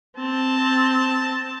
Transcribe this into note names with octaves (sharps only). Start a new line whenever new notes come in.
C4 A5